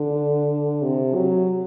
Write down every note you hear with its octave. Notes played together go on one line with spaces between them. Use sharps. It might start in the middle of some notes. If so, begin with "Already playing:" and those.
Already playing: D3
C3
F#3